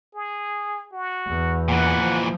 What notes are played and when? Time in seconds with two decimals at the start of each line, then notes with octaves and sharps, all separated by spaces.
0.15 G#4
0.93 F#4
1.27 E2
1.69 A#2 E3 F#5
2.00 F3